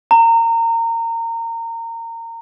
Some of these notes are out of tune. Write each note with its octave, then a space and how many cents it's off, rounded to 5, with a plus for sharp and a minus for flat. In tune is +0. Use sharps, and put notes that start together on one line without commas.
A#5 -25